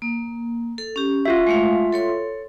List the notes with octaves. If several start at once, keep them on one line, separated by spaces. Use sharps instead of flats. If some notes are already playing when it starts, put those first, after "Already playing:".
A#3
A4
C#4 G4
F4 F#4 E5
G#3 A3 F5
A4 C#5 C6